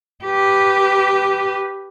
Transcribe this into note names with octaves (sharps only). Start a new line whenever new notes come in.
G4 B4